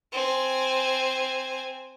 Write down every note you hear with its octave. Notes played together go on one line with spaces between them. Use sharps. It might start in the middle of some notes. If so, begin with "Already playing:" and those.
C4 G#5